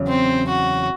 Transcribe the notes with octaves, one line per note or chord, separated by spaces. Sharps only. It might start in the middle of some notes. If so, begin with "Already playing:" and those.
Already playing: E2 C#3 F#3
C4
F#4